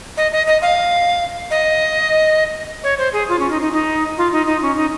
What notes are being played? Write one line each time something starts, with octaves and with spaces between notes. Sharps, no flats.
D#5
D#5
D#5
F5
D#5
C#5
C5
G#4
F4
C#4
D#4
D#4
D#4
F4
D#4
D#4
C#4
D#4